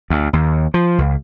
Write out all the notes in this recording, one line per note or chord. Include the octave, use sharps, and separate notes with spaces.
D2
D#2
F3
C#2